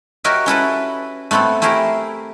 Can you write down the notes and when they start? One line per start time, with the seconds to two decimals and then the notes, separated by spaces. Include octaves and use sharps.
0.24 F#4 G4 A#4 C#5 D#5 E5
0.46 C#4 E4 A4 B4
1.31 A3 B3 C4 E4 A4
1.62 A3 E4 G4 G#4 A#4